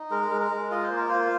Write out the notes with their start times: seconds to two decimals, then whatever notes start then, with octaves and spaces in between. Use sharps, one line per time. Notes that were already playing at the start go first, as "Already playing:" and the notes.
Already playing: D#4
0.10 G#3 A#4
0.31 G#3
0.41 A#4
0.51 G#3
0.71 F4 D#5
0.83 C5
0.91 A#3
0.97 A#4
1.09 F4 C5